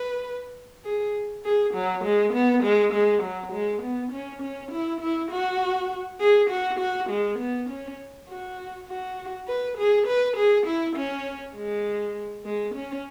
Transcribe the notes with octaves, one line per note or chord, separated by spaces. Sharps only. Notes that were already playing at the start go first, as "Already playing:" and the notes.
Already playing: B4
G#4
G#4
F#3
G#3
B3
G#3
G#3
F#3
G#3
B3
C#4
C#4
E4
E4
F#4
G#4
F#4
F#4
G#3
B3
C#4
F#4
F#4
B4
G#4
B4
G#4
E4
C#4
G#3
G#3
C#4